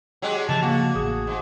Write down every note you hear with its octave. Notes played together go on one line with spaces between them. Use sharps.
F#3 G#3 G4
C#3 E3 F3 A5
A#3 F#4
A1 G#4
G#2